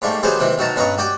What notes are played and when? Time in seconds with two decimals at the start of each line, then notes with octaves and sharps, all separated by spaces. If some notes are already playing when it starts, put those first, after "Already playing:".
0.02 G#2 G3 A3 A#3
0.23 D#3 F#3 B3 G4 G#4 C5
0.40 C3 D#3 E3
0.58 B1 D#3 F#4 A5 A#5
0.76 G2 C#4 B4 D#5 A#5 C#6
0.98 F#4 G4 D5 G5